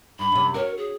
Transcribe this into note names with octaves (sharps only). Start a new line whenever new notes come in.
G2 B5
F#2 C3
F#4 A#4 C#5
G#4